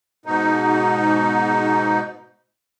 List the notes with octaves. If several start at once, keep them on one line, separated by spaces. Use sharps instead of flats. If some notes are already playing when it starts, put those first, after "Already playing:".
G#2 B2 D#4